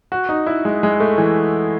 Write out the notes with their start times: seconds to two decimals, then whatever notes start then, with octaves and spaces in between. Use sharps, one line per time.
0.12 F#4
0.29 D#4
0.47 E4
0.65 G#3
0.83 G#3
1.00 A3
1.18 E3